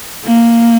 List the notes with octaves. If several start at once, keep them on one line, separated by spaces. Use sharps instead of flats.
A#3